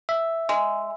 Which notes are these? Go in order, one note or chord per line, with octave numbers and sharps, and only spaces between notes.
E5
G#3